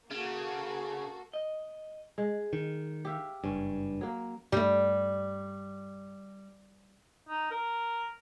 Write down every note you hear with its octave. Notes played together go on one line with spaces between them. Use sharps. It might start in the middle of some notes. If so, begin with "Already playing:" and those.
C#3 A#3 F#4 A4
D#5
G#3
D#3
G4 E5 F5
F#1 G2 C#4
F#3 A#3
G2 G3 A3
D#4
A#4